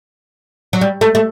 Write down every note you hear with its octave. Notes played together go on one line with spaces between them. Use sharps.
F#3
G3
A3
A3